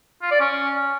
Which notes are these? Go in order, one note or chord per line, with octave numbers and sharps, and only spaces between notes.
F4
D5
C#4